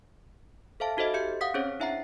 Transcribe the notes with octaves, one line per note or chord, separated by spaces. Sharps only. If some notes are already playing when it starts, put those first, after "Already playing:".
A4 C5 E5 F5 A5
D#4 F#4 A4 C5 D#5 E5
G4 E5 G6 C#7
F5 F#5 D#6 B6
C4 C#4 G#4 C5 C#5
D4 E4 E5 F#5 A#5 C7